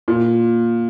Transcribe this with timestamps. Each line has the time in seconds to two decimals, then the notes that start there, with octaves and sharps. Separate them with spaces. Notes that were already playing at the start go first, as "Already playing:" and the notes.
0.08 A#2